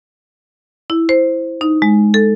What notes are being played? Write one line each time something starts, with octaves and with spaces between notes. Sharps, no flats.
E4
C5
D#4
G#3
A4